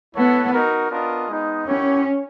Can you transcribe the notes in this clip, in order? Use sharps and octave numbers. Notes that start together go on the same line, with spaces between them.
B3 E4 A4 C#5 F#5
D#4 F#4 A#4
B3 D4 F4 A#4 D#5
G#3 B3 D#4
C#4 E4 G4 A#4 C#5 F#5